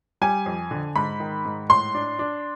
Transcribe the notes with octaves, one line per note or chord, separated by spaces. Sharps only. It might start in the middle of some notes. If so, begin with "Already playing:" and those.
G3 G#5
F2
D3
G#2 B5
D#3
G#2
A2 C6
D4
D4